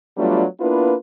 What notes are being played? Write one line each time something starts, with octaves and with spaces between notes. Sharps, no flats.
F#3 G3 A3 B3 D4 F4
A#3 B3 D4 E4 F4 B4